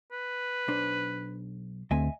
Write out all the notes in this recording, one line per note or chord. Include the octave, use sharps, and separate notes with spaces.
B4
B1 D4 C5
D2 A3 C4 D#5 E5 G#5